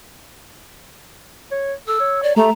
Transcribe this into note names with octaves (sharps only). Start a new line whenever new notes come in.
C#5
A4 E6
C#5
D5
A3 G4 A#5